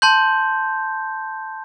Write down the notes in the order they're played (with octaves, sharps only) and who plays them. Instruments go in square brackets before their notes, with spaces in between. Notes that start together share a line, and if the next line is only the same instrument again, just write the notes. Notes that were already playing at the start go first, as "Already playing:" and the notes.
[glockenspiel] A5 C6 G6